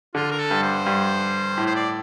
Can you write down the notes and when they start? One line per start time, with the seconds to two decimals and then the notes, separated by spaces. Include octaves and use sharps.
0.15 D3 F4
0.31 A#4
0.38 A4
0.51 G2
0.63 C5
0.86 G2
1.58 A2
1.67 C5
1.76 D5